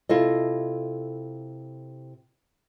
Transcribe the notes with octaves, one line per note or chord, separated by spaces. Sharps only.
C3 E4 F4 A4 D#5